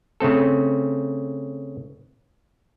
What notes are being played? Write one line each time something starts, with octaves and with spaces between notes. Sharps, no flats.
C#3 A3 C4 A4